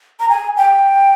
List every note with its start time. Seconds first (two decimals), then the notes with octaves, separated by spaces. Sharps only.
0.20 A#5
0.29 G#5
0.57 G5